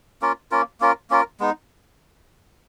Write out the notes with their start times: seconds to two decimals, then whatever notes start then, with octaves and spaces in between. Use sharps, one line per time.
0.22 A#3 C#4 F4 A#4
0.51 A#3 C#4 F4 A#4
0.80 A#3 C#4 F4 A#4
1.10 A#3 C#4 F4 A#4
1.40 G#3 B3 D#4